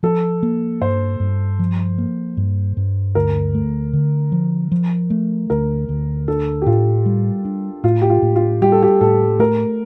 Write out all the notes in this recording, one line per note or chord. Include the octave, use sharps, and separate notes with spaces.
F3 A4
A#3
G2 C5
G2
F3
A#3
G2
G2
D2 A#4
A3
D3
F3
F3
A3
D2 A#4
D2
D4 A4
G4
A2 F4
G3
D4
A2 F4
G4
F4
A2
F4
G3 G4
A4
G4
A2 A4
A3 A#4